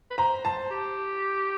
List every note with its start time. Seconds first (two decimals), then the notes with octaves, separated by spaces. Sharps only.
0.11 B4
0.18 C5 A#5
0.44 C5 A5
0.70 G4